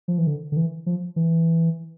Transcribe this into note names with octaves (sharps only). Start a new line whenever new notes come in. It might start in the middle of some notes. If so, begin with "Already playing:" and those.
F3
E3
D3
D3
E3
F3
E3